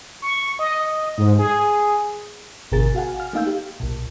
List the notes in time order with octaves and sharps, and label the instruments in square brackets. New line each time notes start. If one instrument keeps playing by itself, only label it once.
[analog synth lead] C#6
D#5
G#2
G#4
[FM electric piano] G#1 B2 D3 G#4 A#4 A6
F#4 F5 F#5 G#5
F6
A3 A#3 D#4 F5 E6 G6
G4
B1 A#2